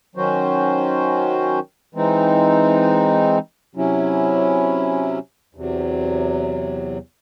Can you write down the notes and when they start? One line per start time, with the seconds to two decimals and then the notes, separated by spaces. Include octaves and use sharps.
0.15 D#3 F#3 C#4 F#4 C5
1.95 E3 G#3 C4 D#4
3.75 C3 F#3 C#4 E4
5.55 E2 C3 F#3